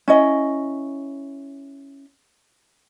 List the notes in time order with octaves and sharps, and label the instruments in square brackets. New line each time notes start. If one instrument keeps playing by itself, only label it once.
[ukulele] C#4 E4 D#5